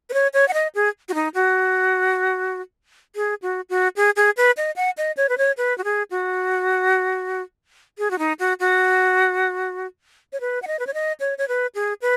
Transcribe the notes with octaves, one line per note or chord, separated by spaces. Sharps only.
B4
C#5
C#5
F#5
D#5
G#4
F#4
D#4
F#4
G#4
F#4
F#4
G#4
G#4
B4
D#5
F#5
D#5
C#5
B4
C#5
B4
F#4
G#4
F#4
G#4
F#4
D#4
F#4
F#4
C#5
B4
F#5
D#5
B4
C#5
D#5
C#5
C#5
B4
G#4
B4